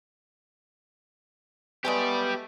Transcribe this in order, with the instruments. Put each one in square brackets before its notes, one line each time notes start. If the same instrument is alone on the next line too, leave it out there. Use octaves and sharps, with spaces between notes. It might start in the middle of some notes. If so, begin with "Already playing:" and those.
[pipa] G#3 A3 G5 [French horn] B3 [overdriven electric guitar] G4 D5